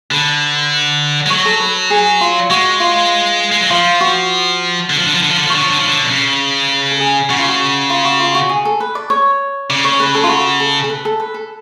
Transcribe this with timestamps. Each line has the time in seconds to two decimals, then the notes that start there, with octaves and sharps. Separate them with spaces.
0.11 D3 B4
1.26 G#3
1.30 F#3 C#5
1.45 A4
1.60 B4
1.90 G#4
2.21 F4
2.50 G#3 F#4
2.80 F4
3.51 G#3
3.61 F#3
3.70 F3 F4
4.01 F#4
4.90 D3
4.98 F3
5.07 D3
5.15 F3
5.22 D3
5.31 F3
5.39 D3
5.47 F3
5.50 C#5
5.55 D3
5.63 F3
5.70 D3
5.79 F3
5.88 D3
6.04 B2
6.10 C#3
6.69 B4
6.91 A4
7.00 G#4
7.30 C#3 F#4
7.39 F4
7.49 F#4
7.90 F4
8.05 F#4
8.20 F4
8.35 F#4
8.49 G#4
8.65 A4
8.80 B4
8.95 D5
9.10 C#5
9.70 C#3 D5
9.84 C#5
10.00 B4
10.15 A4
10.24 F4
10.29 F#4
10.60 A4
10.84 A4
10.89 B4
11.05 A4
11.20 B4
11.34 A4